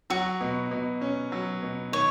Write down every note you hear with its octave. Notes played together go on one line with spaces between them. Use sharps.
F#3 F#4
B2
B2
C#4
F#3
B2
D#3 C#5